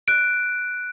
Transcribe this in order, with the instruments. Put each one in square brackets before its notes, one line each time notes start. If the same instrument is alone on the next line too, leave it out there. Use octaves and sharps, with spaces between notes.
[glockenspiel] F#6 D7